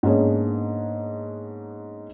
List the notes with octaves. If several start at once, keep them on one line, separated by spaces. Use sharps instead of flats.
G#2 A#3 B3 C#4 D4 G#4